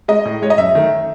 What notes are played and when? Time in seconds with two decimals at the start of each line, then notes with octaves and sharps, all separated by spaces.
0.08 G#3 D#5
0.25 A2
0.42 G#3 C#5
0.50 D#5
0.58 F#2 E5
0.75 D#3 A3